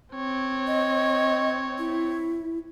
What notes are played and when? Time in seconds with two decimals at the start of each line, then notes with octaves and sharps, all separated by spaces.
0.15 C4 C#5
0.67 D#5
1.78 E4